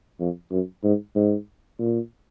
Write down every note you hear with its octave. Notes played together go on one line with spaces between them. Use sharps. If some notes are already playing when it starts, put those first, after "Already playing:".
F2
F#2
G#2
G#2
A#2